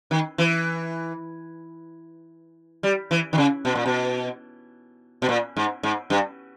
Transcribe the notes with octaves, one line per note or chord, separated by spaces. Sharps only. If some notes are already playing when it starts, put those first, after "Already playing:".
D#3
E3
G3
E3
D#3
C#3
B2
A#2
B2
B2
A#2
G#2
G#2
G2